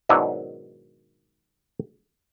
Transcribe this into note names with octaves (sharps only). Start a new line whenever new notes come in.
G#2 B2 D#3 F#3 D4 E4